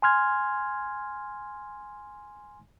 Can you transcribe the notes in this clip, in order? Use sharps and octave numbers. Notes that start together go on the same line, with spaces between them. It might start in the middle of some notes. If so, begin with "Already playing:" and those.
G#5 C6 F6 G#6